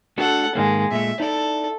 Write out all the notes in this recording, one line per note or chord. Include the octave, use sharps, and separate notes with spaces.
A3 D4 F#4 A4 F#5
G#2 D#3 G#3 A#3
A#2 G#3 A3 E5
D#4 E4 A4 D5